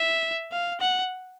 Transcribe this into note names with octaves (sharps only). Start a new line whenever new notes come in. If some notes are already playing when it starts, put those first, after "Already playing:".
Already playing: E5
F5
F#5